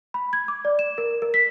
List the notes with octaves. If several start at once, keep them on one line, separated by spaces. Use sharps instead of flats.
B5
G#6
D6
D5
E7
A#4
A#4
B6